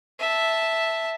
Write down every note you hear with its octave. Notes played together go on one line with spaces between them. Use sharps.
E5 A5